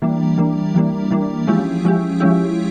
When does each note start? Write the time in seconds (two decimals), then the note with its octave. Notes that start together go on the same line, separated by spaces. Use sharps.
0.02 E3 G3 A#3 D4
0.38 E3 G3 A#3 D4
0.74 E3 G3 A#3 D4
1.11 E3 G3 A#3 D4
1.47 F3 G#3 C#4 E4 G4
1.84 F3 G#3 C#4 E4 G4
2.20 F3 G#3 C#4 E4 G4